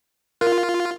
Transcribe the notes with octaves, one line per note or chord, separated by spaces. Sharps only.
F4 A#4